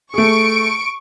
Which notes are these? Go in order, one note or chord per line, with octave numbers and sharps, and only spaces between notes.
A3 G#4 C#6 D7